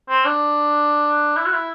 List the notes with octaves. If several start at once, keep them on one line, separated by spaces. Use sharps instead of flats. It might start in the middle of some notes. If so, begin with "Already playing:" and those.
C4
D4
E4
F#4
E4